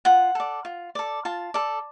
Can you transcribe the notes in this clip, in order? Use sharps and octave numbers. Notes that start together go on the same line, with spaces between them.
F4 F#5
A4 D5
F4
A4 D5
F4 A5
A4 D5